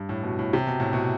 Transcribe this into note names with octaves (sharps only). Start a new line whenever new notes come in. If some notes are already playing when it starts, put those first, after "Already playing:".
Already playing: G2
A2
B2
A2
C3
B2
A2
B2